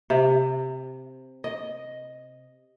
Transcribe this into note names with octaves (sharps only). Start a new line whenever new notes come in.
C3
D#5